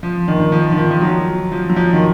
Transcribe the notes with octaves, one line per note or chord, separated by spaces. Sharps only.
F3
D#3
D#3
F3
D#3
F3
F3
F#3
F3
F#3
F3
D#3